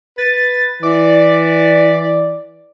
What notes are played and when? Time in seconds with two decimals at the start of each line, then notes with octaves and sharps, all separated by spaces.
0.18 B4 A6
0.83 E3 D5